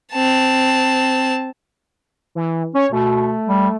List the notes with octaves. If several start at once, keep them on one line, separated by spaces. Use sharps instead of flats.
C4 A5
E3
C#4 C#5
B2 A3
G3